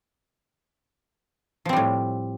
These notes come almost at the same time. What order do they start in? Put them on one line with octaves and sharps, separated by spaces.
F3 C4 G3 A2